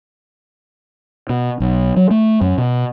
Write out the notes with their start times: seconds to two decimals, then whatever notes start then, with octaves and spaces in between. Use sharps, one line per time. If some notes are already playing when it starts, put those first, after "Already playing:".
1.29 B2
1.60 B1
1.96 F#3
2.11 A3
2.41 F#2
2.58 B2